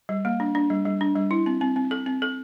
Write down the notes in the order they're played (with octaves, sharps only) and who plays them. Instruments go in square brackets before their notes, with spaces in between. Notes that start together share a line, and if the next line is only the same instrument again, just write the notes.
[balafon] G3
A#3
D4
D4
G3
G3
D4
G3
E4
C4
C4
C4
A4
C4
A4